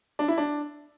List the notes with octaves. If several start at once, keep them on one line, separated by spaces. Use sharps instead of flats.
D4
E4
D4